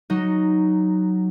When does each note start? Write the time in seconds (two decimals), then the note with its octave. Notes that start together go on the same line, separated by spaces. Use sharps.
0.10 F#3 D#4